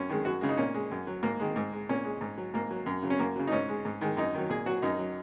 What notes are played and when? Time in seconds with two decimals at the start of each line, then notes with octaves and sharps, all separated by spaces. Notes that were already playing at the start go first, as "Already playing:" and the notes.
Already playing: F#2 C#4
0.10 D#3 G#3
0.25 F#2 F#4
0.41 C#3 G#3
0.49 D#4
0.57 A#2 C#4
0.74 G#3
0.91 F#2
1.07 F#3
1.23 G#2 A#3
1.40 D#3 G#3
1.56 G#2
1.73 G#3
1.89 A#2 C#4
2.04 G#3
2.21 G#2
2.38 F#3
2.54 G#2 A#3
2.71 F#3
2.86 F#2
3.03 C#3 F#3
3.10 C#4
3.19 F#2 A#3
3.36 C#3 F#3
3.47 D#4
3.52 G#2 C#4
3.69 G#3
3.85 G#2
4.01 D#3 G#3
4.17 F#2 D#4
4.34 D#3 F#3
4.50 A#2 G#4
4.66 F#3 F#4
4.82 F#2 D#4
4.99 F#3